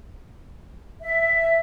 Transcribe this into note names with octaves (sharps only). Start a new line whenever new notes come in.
E5